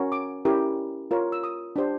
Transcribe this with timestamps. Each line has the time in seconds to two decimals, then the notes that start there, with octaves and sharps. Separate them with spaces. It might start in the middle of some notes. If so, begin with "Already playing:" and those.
Already playing: C#4 F#4 A#4 C#5
0.12 D6
0.45 C#4 E4 G4 A#4
1.11 F4 A#4 C#5
1.32 E6
1.43 D#6
1.76 D4 G4 C5